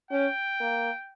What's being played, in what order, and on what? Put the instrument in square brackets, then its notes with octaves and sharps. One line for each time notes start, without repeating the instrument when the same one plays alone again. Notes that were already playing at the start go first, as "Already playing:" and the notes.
[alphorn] C#4 [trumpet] G5
[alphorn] A#3